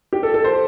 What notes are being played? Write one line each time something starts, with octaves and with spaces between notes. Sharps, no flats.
G4
A4
A4
C5